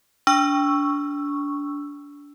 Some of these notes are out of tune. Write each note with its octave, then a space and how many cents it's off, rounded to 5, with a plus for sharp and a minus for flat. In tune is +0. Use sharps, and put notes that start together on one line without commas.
D4 -25 C#6 +0 E6 +5